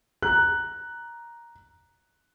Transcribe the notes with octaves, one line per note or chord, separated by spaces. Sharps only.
A#5 F#6